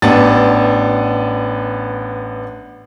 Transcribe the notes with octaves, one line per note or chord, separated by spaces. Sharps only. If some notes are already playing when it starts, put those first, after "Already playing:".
A1 B3 D4 A6